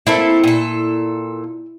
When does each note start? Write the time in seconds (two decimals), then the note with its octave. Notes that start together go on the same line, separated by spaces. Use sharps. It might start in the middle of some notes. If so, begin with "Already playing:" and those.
0.07 A#3 C4 E4 A4
0.44 A#2 A4